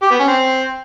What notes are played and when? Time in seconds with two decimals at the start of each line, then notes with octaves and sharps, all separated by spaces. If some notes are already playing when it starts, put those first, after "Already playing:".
0.02 G4
0.11 B3
0.19 C#4
0.28 C4